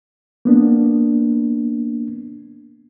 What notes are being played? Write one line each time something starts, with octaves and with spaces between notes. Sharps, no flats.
A#3 B3 D4